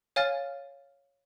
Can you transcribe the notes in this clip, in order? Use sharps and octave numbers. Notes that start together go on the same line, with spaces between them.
C#5 F5 G#5 F6 A6